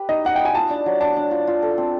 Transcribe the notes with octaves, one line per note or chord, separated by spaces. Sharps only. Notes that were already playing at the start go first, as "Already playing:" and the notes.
Already playing: G4 B4
D#4 D#5
D#5 F#5
B4 G5
G#5
F4 A5
D4
F#3
D4 A5
D4
F4
F4
A4
C4